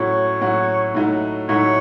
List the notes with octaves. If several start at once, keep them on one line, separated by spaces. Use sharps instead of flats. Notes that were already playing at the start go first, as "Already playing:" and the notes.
Already playing: A2 F#3 C#4 F#4 C#5
A2 F#3 C#4 F#4
A2 F#3 A3 D#4 F#4
A2 F#3 A3 D#4 F#4 C#5